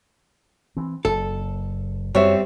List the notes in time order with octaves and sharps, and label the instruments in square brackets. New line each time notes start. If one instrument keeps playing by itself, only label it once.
[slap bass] E3 C4
[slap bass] F#1 [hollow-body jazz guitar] A4
[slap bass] F#2 [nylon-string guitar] G3 C4 E5 [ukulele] F#4 C#5